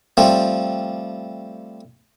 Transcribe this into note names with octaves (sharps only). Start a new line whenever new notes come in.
F3 G3 A3 C4